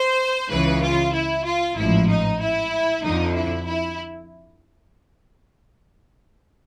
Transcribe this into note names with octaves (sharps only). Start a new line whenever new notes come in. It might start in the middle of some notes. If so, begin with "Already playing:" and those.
Already playing: C5
C#2 C#3 E3 B4
F4
E4
F4
A1 G#2 F3 E4
D#4
E4
F2 D3 F3 D#4
E4
E4